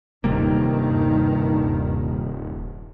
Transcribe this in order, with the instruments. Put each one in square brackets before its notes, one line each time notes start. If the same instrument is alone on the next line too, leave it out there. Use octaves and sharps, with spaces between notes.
[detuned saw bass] D#1 [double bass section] G2 D#3 [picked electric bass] C3 G3 A#3